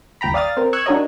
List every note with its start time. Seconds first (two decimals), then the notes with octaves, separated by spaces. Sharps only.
0.21 G1 D#2 G5 A#5 B5
0.34 D5 F5 D#6 F6 A6
0.57 C4 A#4
0.73 C#6 E6 F#6 G#6
0.86 D4 D#4 F#4 A#4 C#5 D#5